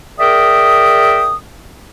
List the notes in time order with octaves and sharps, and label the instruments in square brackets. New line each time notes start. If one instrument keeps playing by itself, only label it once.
[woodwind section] G#4 A#4 D5 E5 G5 D#6